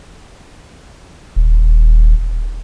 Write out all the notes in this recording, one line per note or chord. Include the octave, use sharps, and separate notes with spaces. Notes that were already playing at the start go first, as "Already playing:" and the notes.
D#1